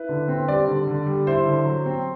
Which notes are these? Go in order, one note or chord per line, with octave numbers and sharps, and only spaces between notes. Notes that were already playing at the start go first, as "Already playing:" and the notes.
Already playing: E4 B4
D3
C4
G3 D5
D3
D3
G3
E4 C5
D3
F#3
C4